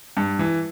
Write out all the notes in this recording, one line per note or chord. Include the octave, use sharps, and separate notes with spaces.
G2
E3